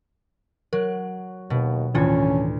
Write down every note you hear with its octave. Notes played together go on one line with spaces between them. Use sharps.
F#3 A#4
D#2 B2
D2 A2 D#3 E3 C#4 F4 G#6